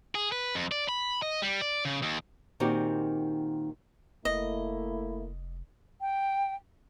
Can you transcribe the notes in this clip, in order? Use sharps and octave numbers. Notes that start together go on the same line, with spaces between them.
G#4
B4
F2
D5
B5
D#5
G3
D5
C#3
D#2
A#2 D#3 C4 D#4 F#4 G4
F1 A3 A#3 E4 D#5
G5